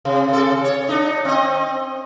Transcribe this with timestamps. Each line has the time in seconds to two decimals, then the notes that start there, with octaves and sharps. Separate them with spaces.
0.05 C3
0.28 C3 A4
0.64 C#5
0.88 D4 D#4
1.25 C4 D#5